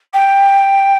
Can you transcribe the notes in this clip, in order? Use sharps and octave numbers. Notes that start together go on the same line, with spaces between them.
G5